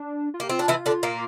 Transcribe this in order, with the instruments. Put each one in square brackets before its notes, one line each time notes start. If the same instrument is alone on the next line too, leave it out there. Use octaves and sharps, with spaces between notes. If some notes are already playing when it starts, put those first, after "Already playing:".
Already playing: [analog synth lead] D4
F4
[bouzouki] A#3 [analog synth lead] G4
[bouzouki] C4 [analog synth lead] F4
[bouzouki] D4
E3 E4
D3 D4
A#2 A#3